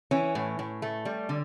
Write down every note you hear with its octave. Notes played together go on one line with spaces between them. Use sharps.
E3 C#4
A2
A2
A3
G3
D3